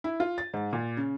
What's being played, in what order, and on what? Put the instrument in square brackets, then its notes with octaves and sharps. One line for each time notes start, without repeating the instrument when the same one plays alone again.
[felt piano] E4
F4
A6
G#2
A#2
C#3